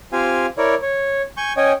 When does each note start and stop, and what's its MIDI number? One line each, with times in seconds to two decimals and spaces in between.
0.13 0.46 60
0.13 0.46 65
0.13 0.46 67
0.13 0.46 77
0.13 0.46 80
0.58 0.75 64
0.58 0.75 70
0.58 0.75 73
0.58 0.75 74
0.82 1.22 73
1.37 1.53 80
1.37 1.53 85
1.37 1.53 91
1.57 1.73 61
1.57 1.73 73
1.57 1.73 75
1.57 1.73 79
1.57 1.73 80